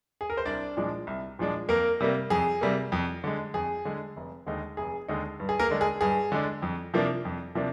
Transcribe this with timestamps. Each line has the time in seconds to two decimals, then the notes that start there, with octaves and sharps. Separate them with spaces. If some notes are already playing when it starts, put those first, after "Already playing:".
0.21 G#4
0.30 A#4
0.37 C5
0.46 C2 D4 D5
0.77 A#2 F3 G#3 D4
1.07 C2
1.39 A#2 F3 G#3 D4
1.69 F2 A#3 A#4
2.00 C3 G3 A#3
2.30 F2 G#4
2.61 C3 G3 A#3
2.92 F2
3.24 D3 G#3
3.54 F2 G#4
3.85 D3 G#3
4.17 F1
4.46 D#2 D3 G#3 D#4
4.77 F1 G#4
5.08 D#2 D3 G#3 D#4
5.40 G2
5.49 G#4
5.59 A#3 A#4
5.70 D3 G#3 D4
5.81 G#4
6.01 G2 G#4
6.32 D3 G#3 D4
6.62 F2
6.94 C3 F3 A#3 D4
7.25 F2
7.55 C3 F3 A#3 D4